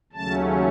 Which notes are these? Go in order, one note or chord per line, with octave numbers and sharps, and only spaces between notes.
D#2 C#3 F#3 A3 C#4 A5